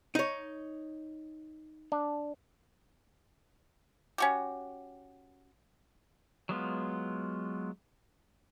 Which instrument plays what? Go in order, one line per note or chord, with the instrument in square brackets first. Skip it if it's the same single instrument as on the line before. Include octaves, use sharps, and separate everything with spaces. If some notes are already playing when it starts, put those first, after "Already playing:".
[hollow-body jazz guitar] D#4 C#5
[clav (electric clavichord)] D4
[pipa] C#4 F#4 G4
[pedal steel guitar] F#3 G#3 B3 F4